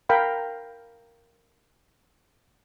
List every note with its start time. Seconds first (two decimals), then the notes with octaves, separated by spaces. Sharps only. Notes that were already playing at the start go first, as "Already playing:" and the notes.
0.09 A#4 F5 G5 B5